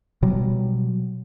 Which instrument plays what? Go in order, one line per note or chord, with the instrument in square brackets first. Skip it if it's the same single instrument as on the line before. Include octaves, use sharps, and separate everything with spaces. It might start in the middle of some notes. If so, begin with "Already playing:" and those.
[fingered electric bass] B2 F#3 G3